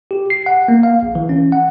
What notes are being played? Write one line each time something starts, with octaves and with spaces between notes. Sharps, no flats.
G4
C7
F#5
A#3
F5
A#1
E3
C#4
F#5